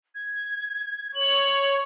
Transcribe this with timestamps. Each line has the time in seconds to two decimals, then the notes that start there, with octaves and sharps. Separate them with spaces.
0.15 G#6
1.15 C#5 F#7